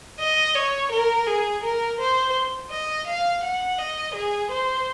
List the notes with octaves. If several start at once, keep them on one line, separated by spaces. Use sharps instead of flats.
D#5
C#5
A#4
G#4
A#4
C5
D#5
F5
F#5
D#5
G#4
C5